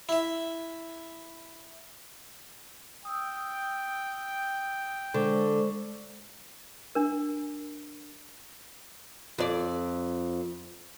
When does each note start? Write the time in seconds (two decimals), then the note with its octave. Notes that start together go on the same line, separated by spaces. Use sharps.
0.09 E4 E5
3.05 G5 D#6 E6
5.14 D3 G#3 C5 C#6
6.95 D4 A#4
9.38 F2 D5